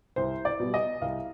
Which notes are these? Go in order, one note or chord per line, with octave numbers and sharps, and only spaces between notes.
C2 C5
D5
B2 G3
D#5
C2 F5